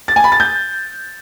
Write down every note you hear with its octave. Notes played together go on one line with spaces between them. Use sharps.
A6
G#5
B5
A6
G6